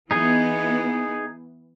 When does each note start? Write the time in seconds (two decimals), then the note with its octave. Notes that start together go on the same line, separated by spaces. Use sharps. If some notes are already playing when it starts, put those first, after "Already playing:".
0.11 E3 B3 D#4 G#4 D#5